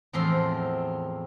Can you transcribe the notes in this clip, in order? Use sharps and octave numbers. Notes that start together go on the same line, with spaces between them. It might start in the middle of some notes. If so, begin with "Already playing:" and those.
E2 A2 F3 C4 C6